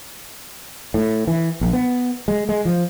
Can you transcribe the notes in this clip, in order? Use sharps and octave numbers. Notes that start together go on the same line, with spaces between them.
A2
E3
A#1
B3
G#3
G#3
F3